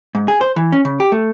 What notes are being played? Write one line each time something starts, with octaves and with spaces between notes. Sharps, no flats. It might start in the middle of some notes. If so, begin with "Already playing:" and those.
G#2
G#4
C5
E3
C#4
C#3
G4
A3